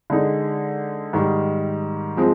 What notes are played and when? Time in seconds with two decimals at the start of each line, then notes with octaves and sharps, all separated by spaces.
0.10 D3 G#3 D#4
1.13 G#2 D#3 G3
2.17 F3 G#3 C4